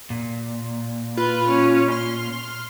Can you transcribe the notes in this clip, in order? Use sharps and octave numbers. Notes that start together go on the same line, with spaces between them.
A#2
F4 B4
C#4
C6 F6